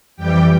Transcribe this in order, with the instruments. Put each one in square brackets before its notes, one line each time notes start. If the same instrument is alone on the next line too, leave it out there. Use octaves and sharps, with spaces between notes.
[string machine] F2 E3 G3 G4 G5